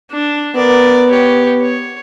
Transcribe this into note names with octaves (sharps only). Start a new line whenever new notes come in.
D4
B3 A#4 D5
G4 C#5
C#5